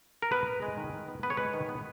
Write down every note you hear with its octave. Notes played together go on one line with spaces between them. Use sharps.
A#4
B3 B4
B3
G#3
D#3
D#3
B3
B3 B4
C#5
G#3 B4
D#3
B3